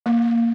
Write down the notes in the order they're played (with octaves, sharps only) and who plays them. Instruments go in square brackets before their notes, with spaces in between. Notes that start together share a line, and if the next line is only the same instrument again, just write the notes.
[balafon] A#3